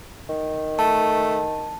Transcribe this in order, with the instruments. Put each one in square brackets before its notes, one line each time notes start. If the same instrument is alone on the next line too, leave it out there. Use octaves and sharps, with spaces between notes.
[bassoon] D#3
[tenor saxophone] A3 [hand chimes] A5